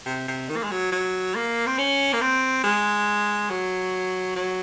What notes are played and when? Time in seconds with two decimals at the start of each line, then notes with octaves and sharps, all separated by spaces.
0.06 C3
0.28 C3
0.49 D#3
0.56 A#3
0.64 G#3
0.71 F#3
0.92 F#3
1.35 A#3
1.67 C4
1.79 C#4
2.13 A#3
2.21 C4
2.64 G#3
3.50 F#3
4.36 F#3